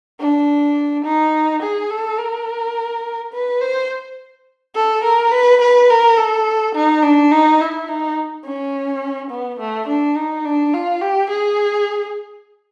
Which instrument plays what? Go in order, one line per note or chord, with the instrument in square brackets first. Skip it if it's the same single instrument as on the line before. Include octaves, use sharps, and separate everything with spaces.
[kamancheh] D4
D#4
G#4
A4
A#4
B4
C5
A4
A#4
B4
B4
A#4
A4
D#4
D4
D#4
E4
D#4
C#4
B3
A3
D4
D#4
D4
F4
G4
G#4